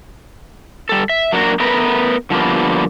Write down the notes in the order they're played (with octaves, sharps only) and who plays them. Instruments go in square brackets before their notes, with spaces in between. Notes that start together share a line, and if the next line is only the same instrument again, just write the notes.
[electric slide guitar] G3 A4
E5
F#3 A#3 D4 E4 F#4 A#4
A3 B3 A#4 B4
D3 F3 G3 A#3 B3